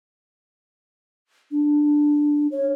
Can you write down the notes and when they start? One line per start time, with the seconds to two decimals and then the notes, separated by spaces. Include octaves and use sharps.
1.51 D4
2.52 C#5